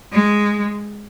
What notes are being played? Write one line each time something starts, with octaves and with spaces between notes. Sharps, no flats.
G#3